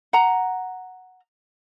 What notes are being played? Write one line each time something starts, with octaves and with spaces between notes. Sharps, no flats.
F#5 A#5